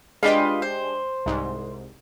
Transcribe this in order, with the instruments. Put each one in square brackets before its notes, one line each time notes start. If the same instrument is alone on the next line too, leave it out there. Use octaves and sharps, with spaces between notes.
[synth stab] G#3 D4 G4 [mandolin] F4 B4 D#5
[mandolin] C5
[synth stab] C2 G#2